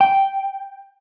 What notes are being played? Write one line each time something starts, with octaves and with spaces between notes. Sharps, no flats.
G5